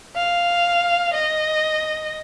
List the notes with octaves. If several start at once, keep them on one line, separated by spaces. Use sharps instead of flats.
F5
D#5